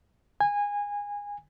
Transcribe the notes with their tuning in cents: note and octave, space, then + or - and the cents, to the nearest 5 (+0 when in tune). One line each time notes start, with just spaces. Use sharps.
G#5 -20